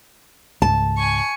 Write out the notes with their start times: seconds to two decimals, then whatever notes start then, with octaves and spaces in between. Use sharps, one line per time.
0.62 C#2 G#2 A5
0.97 G#5 C#6